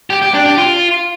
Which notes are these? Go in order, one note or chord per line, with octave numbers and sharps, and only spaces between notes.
G4
G4
D4
G4
F4